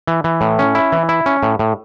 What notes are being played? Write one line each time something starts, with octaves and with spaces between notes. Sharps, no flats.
E3
E3
A2
C#4
E4
E3
E4
C#4
A2
A2